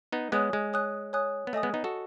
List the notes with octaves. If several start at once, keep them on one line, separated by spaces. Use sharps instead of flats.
B3 D#4
G#3 B3 C#5 G#5 D#6 F#6
G#3
C#5 G#5 D#6 F#6
C#5 G#5 D#6 F#6
B3
A3 D#5 G#5 D#6
G#3 B3
B3 D#4
F#4 A4